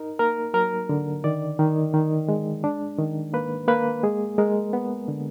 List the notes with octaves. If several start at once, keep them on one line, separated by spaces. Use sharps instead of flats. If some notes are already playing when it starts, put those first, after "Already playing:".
Already playing: D#4 A#4
A#3 A#4
F#3 A#4
D3
D#3 D5
D#3
D#3
G#3
D4
D#3
A#3 B4
A#3 B4
G#3 G#4
G#3 A#4
B3
D3